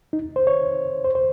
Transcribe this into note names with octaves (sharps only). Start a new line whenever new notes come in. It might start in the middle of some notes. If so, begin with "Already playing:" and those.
D#4
C5
C#5
C5
C5